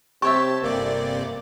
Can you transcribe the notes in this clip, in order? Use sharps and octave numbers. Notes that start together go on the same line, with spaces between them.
C3 G4 C#5 E5 A5 C#6
G1 C3 A#3 D5